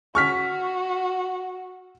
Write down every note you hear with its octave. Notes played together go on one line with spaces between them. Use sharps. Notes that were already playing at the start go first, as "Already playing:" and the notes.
F#4 C#6 F6 B6